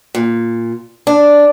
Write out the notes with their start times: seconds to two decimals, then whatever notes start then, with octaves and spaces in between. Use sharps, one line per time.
0.15 A#2
1.07 D4